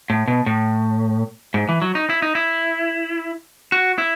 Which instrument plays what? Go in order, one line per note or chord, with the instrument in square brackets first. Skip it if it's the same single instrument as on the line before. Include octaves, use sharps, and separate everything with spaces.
[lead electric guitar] A2
B2
A2
G#2
E3
F#3
D#4
E4
D#4
E4
F#4
E4